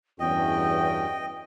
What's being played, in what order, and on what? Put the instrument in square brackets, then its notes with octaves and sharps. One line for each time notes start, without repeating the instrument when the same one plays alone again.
[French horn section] E2 [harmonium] G2 C#4 F#4 [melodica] D#5 [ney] G5